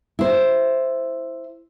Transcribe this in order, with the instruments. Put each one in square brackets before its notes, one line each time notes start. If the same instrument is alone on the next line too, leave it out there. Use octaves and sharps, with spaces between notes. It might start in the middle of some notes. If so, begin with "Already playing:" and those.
[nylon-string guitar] E4 C5